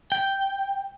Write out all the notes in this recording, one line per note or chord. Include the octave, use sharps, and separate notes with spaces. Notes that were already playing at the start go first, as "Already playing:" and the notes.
G5